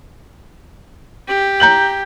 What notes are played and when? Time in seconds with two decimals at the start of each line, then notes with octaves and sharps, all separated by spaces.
1.28 G4
1.60 A#5 G6 F#7